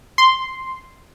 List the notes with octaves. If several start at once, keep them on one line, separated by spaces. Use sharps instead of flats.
C6